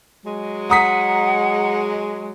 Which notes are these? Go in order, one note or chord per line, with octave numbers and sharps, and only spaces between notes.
F#3 G#3
F#5 A#5 D#6 B6